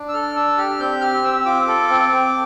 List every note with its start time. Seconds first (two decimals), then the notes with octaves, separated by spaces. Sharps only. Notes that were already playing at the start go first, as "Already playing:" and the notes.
Already playing: D4
0.08 E6
0.13 A4 F6
0.36 D4 E6
0.58 G4 F6
0.79 C4 G6
1.01 G4 F6
1.24 C4 E6
1.46 F4 D6
1.68 A4
1.90 C4
2.12 C4